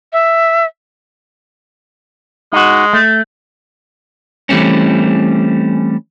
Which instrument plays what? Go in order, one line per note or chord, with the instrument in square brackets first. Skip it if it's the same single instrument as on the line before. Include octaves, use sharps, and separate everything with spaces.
[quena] E5
[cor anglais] G#3 [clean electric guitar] D#4 F#4
[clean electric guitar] A3
E3 G3 A3 C4 C#4